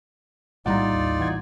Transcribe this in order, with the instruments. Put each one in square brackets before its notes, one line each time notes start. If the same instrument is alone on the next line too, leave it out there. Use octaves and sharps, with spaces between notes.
[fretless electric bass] A#1 A2 G3 [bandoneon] D#4 F4 D5 [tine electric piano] F#5 A#5
[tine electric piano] D#2
E3 F#5 G#6